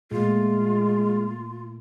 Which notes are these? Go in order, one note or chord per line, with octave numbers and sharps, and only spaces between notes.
A#2 G#3 A3 F4